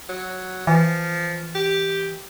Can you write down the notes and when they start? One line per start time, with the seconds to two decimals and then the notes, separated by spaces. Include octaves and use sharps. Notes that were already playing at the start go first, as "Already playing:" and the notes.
0.09 F#3
0.67 E3 F3
1.55 G4